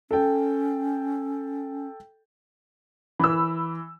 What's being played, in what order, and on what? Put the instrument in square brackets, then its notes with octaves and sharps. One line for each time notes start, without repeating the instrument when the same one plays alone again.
[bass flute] C#4 [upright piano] A4 G5
[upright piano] E3 [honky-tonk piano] B5 E6